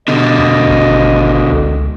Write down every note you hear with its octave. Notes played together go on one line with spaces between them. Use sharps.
B2 D3 D#5
E2
G#1
C#2